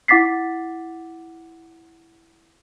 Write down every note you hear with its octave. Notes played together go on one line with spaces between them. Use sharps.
E4 F#5 D6 A6 B6 C7